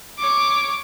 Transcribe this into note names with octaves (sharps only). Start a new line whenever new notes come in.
C#5 D6